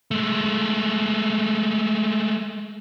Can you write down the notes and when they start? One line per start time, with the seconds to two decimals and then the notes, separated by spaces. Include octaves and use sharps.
0.11 G#3 A3